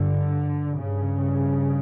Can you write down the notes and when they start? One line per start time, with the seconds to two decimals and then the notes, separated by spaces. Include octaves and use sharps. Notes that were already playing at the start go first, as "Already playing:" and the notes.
Already playing: G2 D3
0.77 G2 C#3